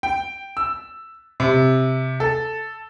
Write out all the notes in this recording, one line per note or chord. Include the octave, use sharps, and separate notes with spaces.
G5
E6
C3
A4